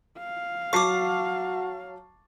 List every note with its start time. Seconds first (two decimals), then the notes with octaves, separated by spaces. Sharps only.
0.19 F5
0.73 F#3 F#4 A5 C#6 D6 C7